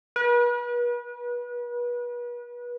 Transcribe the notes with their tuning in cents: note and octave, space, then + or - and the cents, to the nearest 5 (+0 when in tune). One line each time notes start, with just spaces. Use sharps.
B4 -35